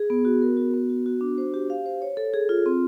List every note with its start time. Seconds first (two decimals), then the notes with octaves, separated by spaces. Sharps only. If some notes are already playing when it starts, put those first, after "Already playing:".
Already playing: G#4
0.10 B3
0.25 F#4
0.42 A#4
0.57 F#4
0.74 B3
0.89 F#4
1.06 F#4
1.21 D4
1.38 C5
1.54 G4
1.70 F5
1.86 C5
2.02 C#5
2.17 A4
2.34 G#4
2.49 F4
2.66 C4